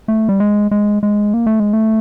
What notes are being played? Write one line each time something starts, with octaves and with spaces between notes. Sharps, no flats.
A3
G3
G#3
G#3
G#3
A#3
A3
G#3
A3